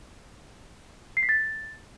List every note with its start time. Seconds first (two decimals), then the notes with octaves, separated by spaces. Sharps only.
1.17 C7
1.23 B6
1.29 A6